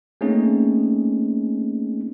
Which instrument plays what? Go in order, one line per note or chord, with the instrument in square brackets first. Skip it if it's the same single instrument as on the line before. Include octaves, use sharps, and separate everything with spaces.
[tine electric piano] A3 A#3 C4 C#4 D#4 G#4